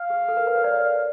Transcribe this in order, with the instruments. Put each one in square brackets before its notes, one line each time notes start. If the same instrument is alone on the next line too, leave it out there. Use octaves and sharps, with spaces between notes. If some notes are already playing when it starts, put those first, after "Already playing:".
Already playing: [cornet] F5
[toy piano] G#4
A4
A#4
B4
C#5
D5